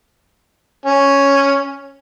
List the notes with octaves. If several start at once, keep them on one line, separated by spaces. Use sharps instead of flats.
C#4